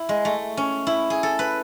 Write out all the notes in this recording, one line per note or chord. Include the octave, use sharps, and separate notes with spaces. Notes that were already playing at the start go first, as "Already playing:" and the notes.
Already playing: E4
G#3
A3
C#4
E4
G#4
A4
B4